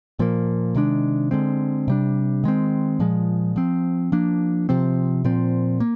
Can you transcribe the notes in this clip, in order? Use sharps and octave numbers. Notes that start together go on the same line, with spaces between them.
A#2 F3 A#3
C3 D#3 G#3 D4
D3 G#3 C4
C3 G3 D4
D#3 G#3 C4
A#2 F3 G#3
F3 C4
F3 A#3 D4
C3 F3 C4
A#2 F3 C4
A#3